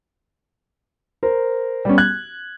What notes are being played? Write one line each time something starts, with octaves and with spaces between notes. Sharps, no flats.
A#4 C5
G3 B3 C#4
F#6 G#6